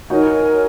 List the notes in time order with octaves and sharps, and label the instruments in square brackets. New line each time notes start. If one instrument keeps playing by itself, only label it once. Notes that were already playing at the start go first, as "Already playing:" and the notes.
[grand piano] D#4 F#4 [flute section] A#4 C#5 G#5